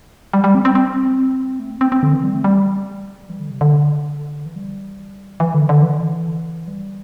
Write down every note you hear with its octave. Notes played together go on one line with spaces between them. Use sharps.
G3
G3
C4
C4
C4
A3
C4
C4
C4
D3
E3
G3
A3
G3
E3
D3
C3
D3
E3
G3
E3
D3
D3
E3
G3